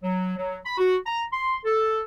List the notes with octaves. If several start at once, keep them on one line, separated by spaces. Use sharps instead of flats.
F#3
F#3
B5
F#4
A#5
C6
A4